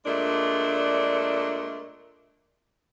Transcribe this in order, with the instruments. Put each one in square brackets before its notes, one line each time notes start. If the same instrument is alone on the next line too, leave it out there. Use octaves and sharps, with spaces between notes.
[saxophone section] A#2 G#3 A3 D4